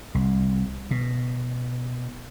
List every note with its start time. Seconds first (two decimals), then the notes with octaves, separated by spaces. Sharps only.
0.15 C2
0.91 B2